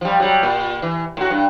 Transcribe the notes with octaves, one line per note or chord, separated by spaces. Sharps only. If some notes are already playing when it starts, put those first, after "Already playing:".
F3 G3
F#3 G3
A#2
E3
A2 F#4
G2